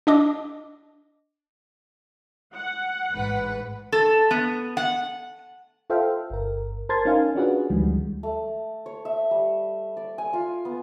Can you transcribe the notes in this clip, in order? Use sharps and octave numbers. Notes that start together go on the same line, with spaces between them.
D4 D#5 D6
F#5
A1 G#2 B4
A4
B3
F#5
F4 A4 C5 E5 F5 G5
G1 A#4
A#4 C5 A5 C6 G#6 A6
C#4 D#4 A#4 F5 G#5
C#4 D4 F4 F#4 G#4 B4
D2 D#3 F3 G3 G#3
A3
C#5
E5
G3
D5
G#5
F4
B3